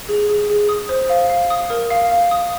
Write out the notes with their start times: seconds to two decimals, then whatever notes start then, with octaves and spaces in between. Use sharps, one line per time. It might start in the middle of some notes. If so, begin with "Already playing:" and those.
0.09 G#4
0.29 G#4
0.50 G#4
0.69 D#6
0.89 C5
1.10 F5
1.30 F5
1.50 D#6
1.70 A#4
1.90 F5
2.11 F5
2.31 D#6